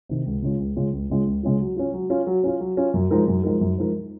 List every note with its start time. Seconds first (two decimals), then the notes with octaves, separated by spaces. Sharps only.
0.09 C3 D#3
0.26 C#2
0.42 C#3 G#3 C#4 F4
0.60 C#2
0.76 C#3 G#3 C#4 F4
0.93 C#2
1.10 C#3 G#3 C#4 F4
1.27 C#2
1.43 C#3 G#3 C#4 F4
1.60 F#3
1.76 C#4 F4
1.94 F#3
2.10 C#4 F4
2.27 F#3
2.44 C#4 F4
2.60 F#3
2.77 C#4 F4
2.94 F#2
3.11 F3 G#3 D#4 A#4
3.28 F#2
3.43 F3 G#3 D#4 A#4
3.61 F#2
3.78 F3 G#3 D#4 A#4